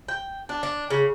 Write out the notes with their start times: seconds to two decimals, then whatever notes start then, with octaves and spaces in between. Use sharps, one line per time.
0.08 G5
0.49 D4
0.63 D4
0.90 C#3